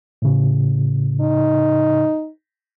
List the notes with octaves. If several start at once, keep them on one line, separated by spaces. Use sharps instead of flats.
A2 C#3
D#4